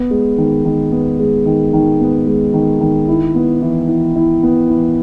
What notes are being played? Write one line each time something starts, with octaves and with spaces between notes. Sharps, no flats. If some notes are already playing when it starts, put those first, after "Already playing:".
Already playing: B3
G#3
D#3
D#3
B3
G#3
D#3
D#3
B3
G#3
D#3
D#3
E4
B3
E3
E3
E4
B3
E3